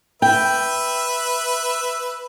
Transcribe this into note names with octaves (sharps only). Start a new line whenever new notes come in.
B4 E5 G5